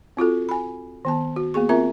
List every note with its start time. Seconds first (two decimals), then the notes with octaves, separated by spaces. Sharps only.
0.17 C4 F4 F#4 A4
0.49 G#5 B5
1.05 D#3 B3 A5
1.36 F#4
1.54 A#3 B3 G#4 C#6
1.69 C4 F4 A#4 E5 A#5